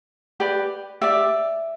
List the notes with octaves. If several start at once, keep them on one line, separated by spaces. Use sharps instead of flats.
G4 B4 D5
G4 D5 E5